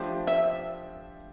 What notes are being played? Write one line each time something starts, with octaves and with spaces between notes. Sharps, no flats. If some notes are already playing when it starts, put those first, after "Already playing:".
Already playing: F3 A3 D4 G4 C5
E5